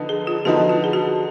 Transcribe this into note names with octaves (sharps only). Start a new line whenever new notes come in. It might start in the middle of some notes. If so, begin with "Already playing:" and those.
Already playing: D3 F3 B3 D#4
G#4
F4
D3 F3 B3 D#4 F#4
F4
G#4
F#4